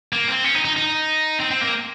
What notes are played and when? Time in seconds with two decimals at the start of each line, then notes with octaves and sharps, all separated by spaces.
0.13 A#3
0.28 C4
0.44 C#4
0.55 D#4
0.65 D#4
0.76 D#4
1.40 C4
1.51 C4
1.61 A#3